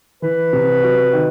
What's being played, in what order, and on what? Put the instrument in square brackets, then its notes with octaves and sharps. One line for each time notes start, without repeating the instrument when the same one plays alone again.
[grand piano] E3 [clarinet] B4
[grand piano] C3
F#3
D#3